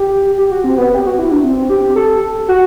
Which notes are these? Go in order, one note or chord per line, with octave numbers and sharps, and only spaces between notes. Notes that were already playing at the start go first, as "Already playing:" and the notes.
Already playing: G4
G4
F#4
C4
B3
G4
F#4
E4
D4
C4
G4
A4
F#4